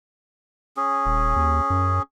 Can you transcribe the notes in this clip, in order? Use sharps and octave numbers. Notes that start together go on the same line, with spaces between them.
C#4 G#4
D#1
D#2
F#2